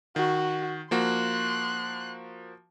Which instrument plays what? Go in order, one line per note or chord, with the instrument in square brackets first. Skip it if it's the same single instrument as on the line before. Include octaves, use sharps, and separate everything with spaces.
[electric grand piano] D#3 [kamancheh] F#4
[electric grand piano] F3 A#3 F#4 [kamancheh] C6 F#6